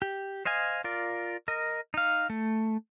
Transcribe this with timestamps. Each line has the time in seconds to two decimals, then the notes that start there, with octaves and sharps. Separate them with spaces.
0.02 G4
0.45 C5 D#5 F5 G#5
0.84 F4 A#4 D5
1.48 A#4 D#5
1.94 D#4 F5
2.30 A3